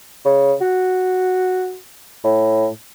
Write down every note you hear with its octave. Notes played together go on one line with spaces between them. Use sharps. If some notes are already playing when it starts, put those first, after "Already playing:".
C#3
F#4
A2